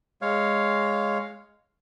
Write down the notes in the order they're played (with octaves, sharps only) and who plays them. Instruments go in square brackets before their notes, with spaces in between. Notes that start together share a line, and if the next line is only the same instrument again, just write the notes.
[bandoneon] G#3 C#5 F5